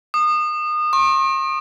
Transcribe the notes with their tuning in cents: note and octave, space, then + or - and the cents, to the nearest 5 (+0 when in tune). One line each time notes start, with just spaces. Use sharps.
D#6 -30
C#6 -45